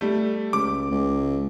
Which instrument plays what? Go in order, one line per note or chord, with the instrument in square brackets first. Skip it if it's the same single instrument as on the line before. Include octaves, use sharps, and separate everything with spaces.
[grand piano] G3 A3
[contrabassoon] C#2 [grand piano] D6
[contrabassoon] C#2